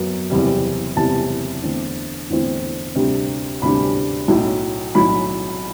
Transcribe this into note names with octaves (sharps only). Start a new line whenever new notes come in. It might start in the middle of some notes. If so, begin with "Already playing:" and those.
Already playing: F#2 F#3 B3
F#1 E2 C3 G3
F#1 E2 C3 G3 A5
E2 D3 A3 C4 E4
E2 D3 A3 C4 E4
D2 C3 G3 D4
D2 C3 G3 D4 B5
B1 A2 F#3
B1 A2 F#3 B5